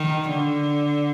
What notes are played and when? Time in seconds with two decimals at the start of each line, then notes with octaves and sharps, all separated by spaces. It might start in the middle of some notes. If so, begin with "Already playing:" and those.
Already playing: D#3
0.30 D3